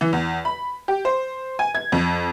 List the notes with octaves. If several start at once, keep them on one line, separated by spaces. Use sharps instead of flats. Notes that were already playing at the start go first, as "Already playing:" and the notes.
E3
E2
B5
G4
C5
G#5
G#6
F2